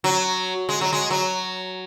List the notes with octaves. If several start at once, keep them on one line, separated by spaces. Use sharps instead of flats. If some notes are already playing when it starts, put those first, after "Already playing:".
F#3
G#3
F#3
G#3
F#3